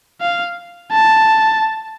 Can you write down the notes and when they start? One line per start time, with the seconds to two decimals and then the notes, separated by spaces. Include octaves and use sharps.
0.21 F5
0.93 A5